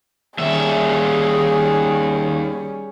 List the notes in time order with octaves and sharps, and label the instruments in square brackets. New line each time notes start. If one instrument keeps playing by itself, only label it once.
[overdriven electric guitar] D#2 E5 [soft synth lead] D#3 [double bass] G3 C#4 [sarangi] G#4